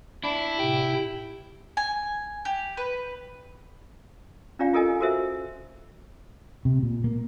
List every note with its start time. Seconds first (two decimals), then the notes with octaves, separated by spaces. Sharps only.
0.24 D4 E4
0.59 A2 C3 G5
1.77 G#5
2.45 G4
2.77 B4
4.59 C#4 D4 F4 G4 D5 F5
4.73 F4 G4 A4 A#4 D#5 G#5
5.00 F#4 A4 A#4 C5 E5
6.65 C3
6.83 A#2
7.04 A#3